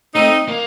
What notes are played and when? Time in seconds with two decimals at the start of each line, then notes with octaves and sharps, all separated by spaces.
0.15 A3 C4 D#4
0.48 A#3